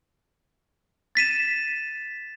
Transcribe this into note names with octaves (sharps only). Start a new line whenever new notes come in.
A6 B6 D#7 E7